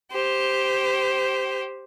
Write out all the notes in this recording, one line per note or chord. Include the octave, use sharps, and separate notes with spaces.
G4 C5